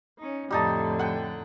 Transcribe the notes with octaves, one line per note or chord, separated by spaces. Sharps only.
C#4 D#4
F2 A2 D3 G3 D#4 A5
F#5 G5